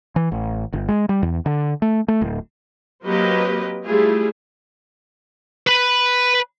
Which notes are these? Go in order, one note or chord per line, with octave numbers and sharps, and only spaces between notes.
E3
A1
G1
G#3
G3
E2
D3
A3
A3
D1
F#3 A#3 C4 G4 B4 D#5
G3 A3 E4 F4 G#4
B4 B5